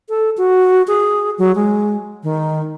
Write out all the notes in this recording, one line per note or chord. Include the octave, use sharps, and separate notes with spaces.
A4
F#4
G#4
F#3
G#3
D#3